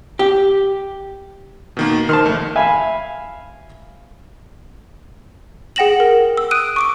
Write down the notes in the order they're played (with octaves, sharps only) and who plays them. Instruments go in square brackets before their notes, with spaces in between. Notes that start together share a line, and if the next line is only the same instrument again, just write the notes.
[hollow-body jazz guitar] G4
[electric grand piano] B2 D#3 A#3
[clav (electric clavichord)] D#3 A5 [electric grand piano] C5 C6 F6
[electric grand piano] A#1 A3
[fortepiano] E5 F5 G#5 B5
[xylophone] G#4 F#5 G5 A#6 E7 F#7
A#4
E6
D#6 F#6 D7 D#7
C#6 D6 D7